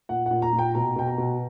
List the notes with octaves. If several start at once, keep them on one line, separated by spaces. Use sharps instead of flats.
A#2 F#5
A#2 F#5
A#5
A#2
G5
B2 A#5
B2 G5
A#5
B2